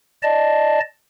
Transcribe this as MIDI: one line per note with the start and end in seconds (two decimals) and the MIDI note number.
0.23 0.80 74
0.23 0.80 75
0.23 0.80 81